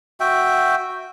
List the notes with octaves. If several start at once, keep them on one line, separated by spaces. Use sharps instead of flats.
F#4 E5 G5